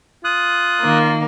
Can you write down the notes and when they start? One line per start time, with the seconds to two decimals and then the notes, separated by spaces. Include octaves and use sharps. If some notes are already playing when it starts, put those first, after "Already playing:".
0.24 F4 D#6 F#6
0.81 D#3 A#3